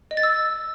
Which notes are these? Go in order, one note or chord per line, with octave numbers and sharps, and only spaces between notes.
D#5
A6
E6